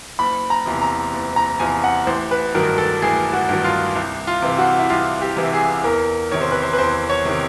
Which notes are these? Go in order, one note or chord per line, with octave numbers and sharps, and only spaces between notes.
F#1 B5
A#5
E2 C3 F3
A#5
F#1
A#5
E2 C3 F3 G#5
F#5
A1 C5
B4
G2 D#3 F#3 A#4
A4
A1 G#4
F#4
G2 D#3 F#3
F4
C2
F4
C3 E3
F#4
E4
C2 F4
G4
C3 E3
G#4
E2 A#4
C3 D#3 C#5
C5
B4
C5
B4
E2 C5
C#5
C3 D#3